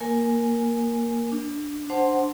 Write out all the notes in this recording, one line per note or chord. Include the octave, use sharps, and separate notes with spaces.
A#3 A#4 G#5
D4
D4 C5 F#5 A5 C6